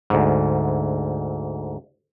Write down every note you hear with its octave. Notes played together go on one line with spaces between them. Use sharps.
D2 G#2